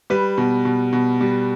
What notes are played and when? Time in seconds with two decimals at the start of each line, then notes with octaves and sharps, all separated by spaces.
0.10 G3 B4
0.38 B2
0.65 B2
0.93 B2
1.21 G3